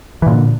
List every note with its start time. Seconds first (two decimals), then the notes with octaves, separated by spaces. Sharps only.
0.22 E3
0.27 A#2
0.31 D3